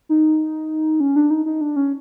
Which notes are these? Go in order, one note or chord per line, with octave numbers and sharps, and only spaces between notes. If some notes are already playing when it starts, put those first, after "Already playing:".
D#4
C#4
D4
D#4
D#4
D4
C#4